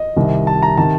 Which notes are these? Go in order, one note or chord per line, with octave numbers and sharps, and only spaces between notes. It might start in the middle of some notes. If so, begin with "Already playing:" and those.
Already playing: D#5
C2 C3 D#3
A5
A#5
C3 D#3 A5